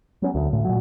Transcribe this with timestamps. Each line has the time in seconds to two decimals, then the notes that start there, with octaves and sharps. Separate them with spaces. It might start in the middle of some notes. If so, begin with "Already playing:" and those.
0.22 F#3 B3 C#4
0.35 D2
0.53 A2
0.65 A#2 F#3